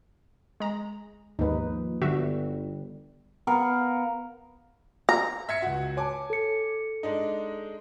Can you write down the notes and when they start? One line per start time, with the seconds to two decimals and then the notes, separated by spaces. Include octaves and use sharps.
0.60 G#3 A#5
1.39 D#2 G#2 F3 A#3 D#4 B4
2.02 G1 D3 G3 F#4 E5
3.47 B3 A#4 F5 F#5
5.09 A#5
5.49 E5 G#6 C#7
5.62 C#2 F#4
5.97 C#5 G#5 A5 D6
6.30 A4 C#7
7.03 G#3 D4 D#4